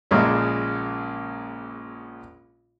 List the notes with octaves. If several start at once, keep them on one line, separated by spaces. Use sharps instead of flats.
A#1 A#2 C#3 G#3 C#4 E5